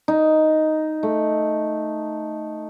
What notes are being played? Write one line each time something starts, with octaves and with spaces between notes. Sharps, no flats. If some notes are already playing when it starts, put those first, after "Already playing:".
D#4
A3